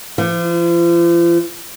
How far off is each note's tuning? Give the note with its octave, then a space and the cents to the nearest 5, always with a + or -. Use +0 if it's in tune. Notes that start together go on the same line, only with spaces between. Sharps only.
F3 -40